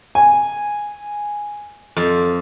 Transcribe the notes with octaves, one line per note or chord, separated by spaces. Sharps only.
G#5
F2